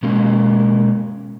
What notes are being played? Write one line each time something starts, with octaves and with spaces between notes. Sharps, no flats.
B2 G#3 A#3 C#4